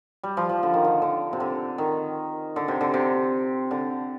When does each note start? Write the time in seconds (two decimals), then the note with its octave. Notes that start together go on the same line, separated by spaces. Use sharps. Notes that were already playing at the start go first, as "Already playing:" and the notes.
0.23 G3
0.37 F3
0.49 F3
0.63 D3
0.74 D#3
0.85 D3
1.02 D3
1.33 C3
1.40 D3
1.78 D#3
2.56 D3
2.68 C3
2.81 D3
2.94 C3
3.71 D3